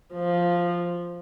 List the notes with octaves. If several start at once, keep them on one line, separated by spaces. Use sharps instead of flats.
F3